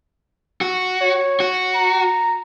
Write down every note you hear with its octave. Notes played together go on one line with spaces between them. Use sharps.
F#4
C#5
F#4
A#5